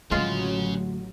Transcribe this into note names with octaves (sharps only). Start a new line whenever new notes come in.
A1 D3 F#3 G#3 A3 C#4 F4 G#4